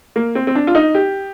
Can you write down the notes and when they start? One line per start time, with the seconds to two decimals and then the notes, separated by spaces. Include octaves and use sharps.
0.16 A#3
0.35 C4
0.47 C4
0.55 D4
0.67 F4
0.75 D#4
0.95 G4